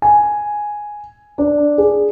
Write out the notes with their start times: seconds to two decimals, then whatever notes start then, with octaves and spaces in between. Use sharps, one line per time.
0.02 G#5
1.38 D4
1.78 G#4